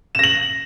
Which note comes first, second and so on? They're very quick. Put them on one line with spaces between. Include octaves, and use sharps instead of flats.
E7 A#6 F#7